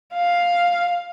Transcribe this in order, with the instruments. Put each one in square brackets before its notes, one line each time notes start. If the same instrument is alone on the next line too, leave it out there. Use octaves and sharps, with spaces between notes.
[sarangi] F5